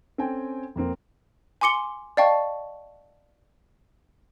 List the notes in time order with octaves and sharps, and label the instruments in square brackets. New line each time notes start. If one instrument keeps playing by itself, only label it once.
[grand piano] C4 C#4 A4 G5 G#5
F2 A#3 C4
[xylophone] G#5 C6 D6 C#7 G7
D5 D#5 F5 G5 A5 C#6